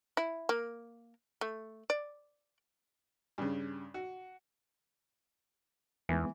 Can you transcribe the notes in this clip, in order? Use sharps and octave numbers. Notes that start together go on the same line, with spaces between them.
E4
A#3
A3
D5
G2 C#3
F#4
E2 E3 G#3 B3